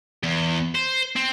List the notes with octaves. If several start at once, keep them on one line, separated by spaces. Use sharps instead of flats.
E2
C5
C4